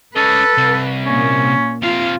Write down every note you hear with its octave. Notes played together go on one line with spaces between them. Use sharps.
C#4 A4 B4 D#5
C2
A#2 A#3 C#4
C3 F4 F5